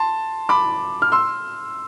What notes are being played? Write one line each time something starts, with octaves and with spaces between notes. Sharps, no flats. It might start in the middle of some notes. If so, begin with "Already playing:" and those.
Already playing: A5 C6
B5 D6
F6
C6 E6